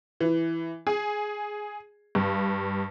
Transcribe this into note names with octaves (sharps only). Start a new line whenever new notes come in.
E3
G#4
G2